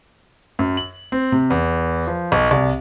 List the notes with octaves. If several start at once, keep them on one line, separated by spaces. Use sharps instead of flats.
F#2
F#7
C4
C3
E2
F3
B1
C2